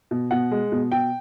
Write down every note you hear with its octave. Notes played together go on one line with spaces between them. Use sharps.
B2
B2 F#5
G#3
B2
B2 G5